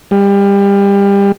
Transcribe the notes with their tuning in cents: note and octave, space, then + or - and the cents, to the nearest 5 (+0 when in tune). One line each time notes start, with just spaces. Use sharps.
G3 +30